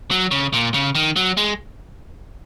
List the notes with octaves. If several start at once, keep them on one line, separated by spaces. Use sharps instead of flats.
F#3
C#3
A#2
C#3
D#3
F#3
G#3